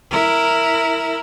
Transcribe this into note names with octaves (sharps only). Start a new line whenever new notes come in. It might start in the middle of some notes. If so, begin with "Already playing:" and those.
E4 A#4